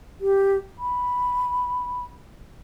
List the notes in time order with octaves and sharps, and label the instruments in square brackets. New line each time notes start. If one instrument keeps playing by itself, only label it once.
[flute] G4
B5